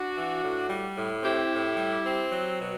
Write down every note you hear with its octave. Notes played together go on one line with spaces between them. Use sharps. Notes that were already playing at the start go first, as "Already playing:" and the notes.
Already playing: D4 F#4
E3
A2
G3
A2
C4 E4 G4
A2
G3
C4
F#3
B2